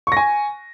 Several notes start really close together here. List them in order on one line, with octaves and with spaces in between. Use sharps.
C#6 A#6 G#5